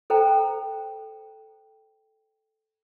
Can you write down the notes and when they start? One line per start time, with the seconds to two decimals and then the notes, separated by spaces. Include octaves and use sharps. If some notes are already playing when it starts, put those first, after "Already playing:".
0.10 A4 C5 G5 A#5